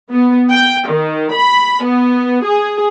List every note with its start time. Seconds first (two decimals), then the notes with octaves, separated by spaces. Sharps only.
0.11 B3
0.51 G5
0.89 D#3
1.35 B5
1.84 B3
2.45 G#4